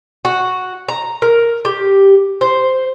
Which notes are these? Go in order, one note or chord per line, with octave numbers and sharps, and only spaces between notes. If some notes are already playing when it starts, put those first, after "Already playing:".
F#4
A#5
A#4
G4
C5